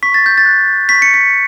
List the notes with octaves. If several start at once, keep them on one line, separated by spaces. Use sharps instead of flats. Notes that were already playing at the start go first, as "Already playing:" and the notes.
C#6 B6
A6
G6
A6
F#6
C#6 B6
C#7
B6